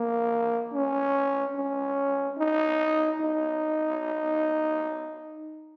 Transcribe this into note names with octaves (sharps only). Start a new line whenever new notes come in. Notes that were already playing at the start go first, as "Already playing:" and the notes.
Already playing: A#3
C#4
C#4
D#4
D#4